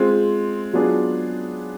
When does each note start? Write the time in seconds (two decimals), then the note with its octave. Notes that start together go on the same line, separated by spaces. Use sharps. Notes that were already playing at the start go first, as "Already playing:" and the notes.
Already playing: G#3 C4 F4
0.73 F#3 B3 D4 F4 G#4